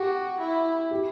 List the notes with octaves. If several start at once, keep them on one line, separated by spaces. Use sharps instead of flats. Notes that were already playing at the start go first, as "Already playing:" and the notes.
Already playing: F#4 G4
E4
G4